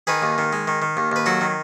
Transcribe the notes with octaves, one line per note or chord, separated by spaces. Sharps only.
D#3 G#4 B4
D#2
D#3
G#3
D#3
D#3
D#2
D#2 B4
F#3 F#4 A4
D#3